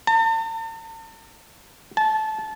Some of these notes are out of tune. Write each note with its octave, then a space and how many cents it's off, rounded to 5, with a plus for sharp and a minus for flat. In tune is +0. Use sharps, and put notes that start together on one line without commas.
A5 +45
A5 -20